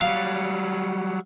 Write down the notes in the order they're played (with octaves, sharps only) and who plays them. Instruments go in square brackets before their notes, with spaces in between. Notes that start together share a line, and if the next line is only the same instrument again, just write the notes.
[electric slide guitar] F#3 G3 [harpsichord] F5